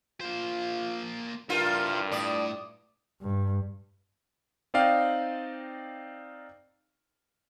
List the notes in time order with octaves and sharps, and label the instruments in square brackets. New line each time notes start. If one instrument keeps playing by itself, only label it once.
[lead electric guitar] A#3 C5 [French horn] F4
[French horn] G2 [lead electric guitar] E4 C5 [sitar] F4 [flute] A#4
[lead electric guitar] A2 [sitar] D5 [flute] D#6
[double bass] G2
[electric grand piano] C4 D#4 D5 D#5 F5 G5